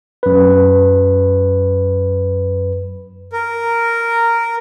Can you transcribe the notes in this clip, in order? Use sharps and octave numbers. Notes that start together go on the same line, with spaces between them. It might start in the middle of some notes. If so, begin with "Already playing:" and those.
F#2 B4
A#4